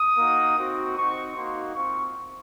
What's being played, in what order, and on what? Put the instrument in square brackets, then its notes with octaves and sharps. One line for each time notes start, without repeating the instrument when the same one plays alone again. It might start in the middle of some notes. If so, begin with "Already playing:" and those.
Already playing: [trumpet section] D#6
A#3 D#4 F#4
C4 D#4 F#4
C4 D#4 F#4 C#6
A#3 D#4 F#4 C6
C4 F4 C#6